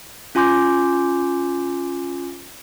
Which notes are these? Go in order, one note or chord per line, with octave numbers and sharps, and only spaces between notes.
C#4 F4 G#5 C6 D6 G6